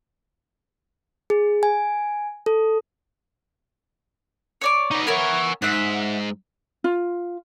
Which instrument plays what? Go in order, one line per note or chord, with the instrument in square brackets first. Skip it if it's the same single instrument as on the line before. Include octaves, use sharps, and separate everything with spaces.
[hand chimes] G#4
G#5
A4
[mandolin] C#5 D5 D6
[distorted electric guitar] B3 D#4
[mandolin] B3 A#4 C#5 [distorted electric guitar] E5 G#5
[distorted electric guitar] G#2 [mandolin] E5 F#5
[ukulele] F4